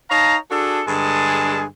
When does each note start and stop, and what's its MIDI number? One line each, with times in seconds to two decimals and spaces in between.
0.11 0.37 63
0.11 0.37 73
0.11 0.37 77
0.11 0.37 81
0.11 0.37 82
0.51 0.83 62
0.51 0.83 66
0.51 0.83 68
0.51 0.83 69
0.87 1.65 43
0.87 1.65 50
0.87 1.65 56
0.87 1.65 68
0.87 1.65 69
0.87 1.65 81